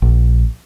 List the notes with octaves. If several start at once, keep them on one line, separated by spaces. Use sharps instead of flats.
A#1